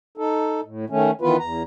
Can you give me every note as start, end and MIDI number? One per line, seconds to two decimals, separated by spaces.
0.17 0.61 63
0.17 0.61 69
0.64 0.85 45
0.90 1.11 51
0.90 1.11 57
0.90 1.11 61
1.21 1.37 51
1.21 1.37 52
1.21 1.37 59
1.21 1.37 65
1.21 1.37 71
1.39 1.63 40
1.39 1.63 82